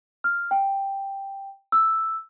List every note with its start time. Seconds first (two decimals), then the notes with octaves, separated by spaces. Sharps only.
0.24 F6
0.51 G5
1.72 E6